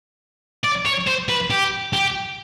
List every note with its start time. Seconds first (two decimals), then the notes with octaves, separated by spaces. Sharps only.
0.64 D5
0.85 C#5
1.07 C5
1.29 B4
1.50 G4
1.93 G4